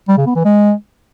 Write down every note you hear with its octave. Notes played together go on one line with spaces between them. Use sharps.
G3
C#3
B3
E3
G#3